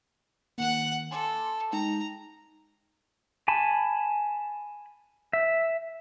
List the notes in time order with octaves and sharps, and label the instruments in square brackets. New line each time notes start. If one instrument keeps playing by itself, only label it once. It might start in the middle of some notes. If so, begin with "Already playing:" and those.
[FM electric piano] D#3 A#3 [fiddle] F#5 F#6
[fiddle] A4 [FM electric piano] G#5 C6 D6
[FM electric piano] G#3 D#4 G5 [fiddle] A#5
[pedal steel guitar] G#5 A5 B5
E5